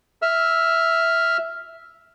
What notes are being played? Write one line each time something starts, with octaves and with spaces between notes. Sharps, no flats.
E5 E6 F6